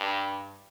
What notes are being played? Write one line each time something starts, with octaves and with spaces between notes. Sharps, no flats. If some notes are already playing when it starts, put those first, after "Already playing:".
Already playing: G2